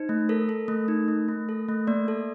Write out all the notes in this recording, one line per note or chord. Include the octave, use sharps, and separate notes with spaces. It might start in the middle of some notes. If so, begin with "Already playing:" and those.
Already playing: D#4 C5
A3
A4 A#4
A4
A3
D#4
A3
A3
A4
A3
A#3 D5
A4